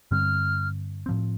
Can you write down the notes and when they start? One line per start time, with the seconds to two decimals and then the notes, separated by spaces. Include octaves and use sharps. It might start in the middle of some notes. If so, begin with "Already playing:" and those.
0.11 G2 D3 G3 C4 F6
1.06 A2 F3 C4